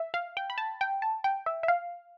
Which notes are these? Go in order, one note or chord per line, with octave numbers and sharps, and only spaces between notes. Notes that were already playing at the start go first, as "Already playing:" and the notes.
Already playing: E5
F5
G5
B5
A5
G5
A5
G5
E5
E5
F5